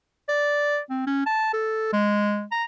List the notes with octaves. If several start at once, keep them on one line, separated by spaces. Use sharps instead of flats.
D5
C4
C#4
A5
A4
G#3
A#5